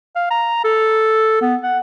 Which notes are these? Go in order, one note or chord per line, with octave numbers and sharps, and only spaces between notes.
F5
A#5
A4
B3
F#5